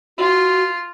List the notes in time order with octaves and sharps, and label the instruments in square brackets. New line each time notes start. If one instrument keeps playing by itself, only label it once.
[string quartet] F4 [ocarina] F#4